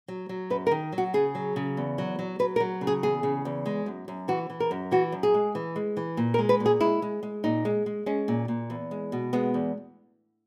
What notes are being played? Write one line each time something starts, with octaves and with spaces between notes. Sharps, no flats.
F#3
F#3
F#2 B4
A#4
D#3
F#3
F#4
C#3 G#4
F#3
C#3
E2
F#3
F#3
F#3 B4
A#4
F#3
C#3
G#4
E2 G#4
C#3
E2
G#3
F#2
F#2
E3 F#4
E3
A#4
F#2
E3 F#4
F#2
G#4
G#3
E3
G#3
E3
A#2
A#4
G#3
B4
A#2
G#4
G#3 E4
G#3
G#3
A#2 D#4
G#3
G#3
G#3 C#4
A#2
A#2
E2
G#3
B2
G#3 B3
E2